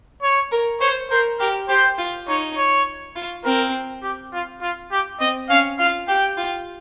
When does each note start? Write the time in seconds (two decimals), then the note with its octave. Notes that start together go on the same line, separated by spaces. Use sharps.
0.22 C#5
0.51 A#4
0.81 C5 C#5
1.10 A#4 C5
1.39 G4 A#4
1.69 G4 C5
1.98 F4
2.27 D#4 C#5
2.57 C#5
3.15 F4
3.45 C4 A#4
4.03 G4
4.33 F4
4.62 F4
4.92 G4
5.20 C4 D#5
5.50 C#4 F5
5.79 F4 F5
6.08 G4 G5
6.37 F4